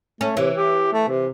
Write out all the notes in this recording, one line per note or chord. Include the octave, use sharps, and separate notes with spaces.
A3 C#4
C3 E3
G4
A3
C3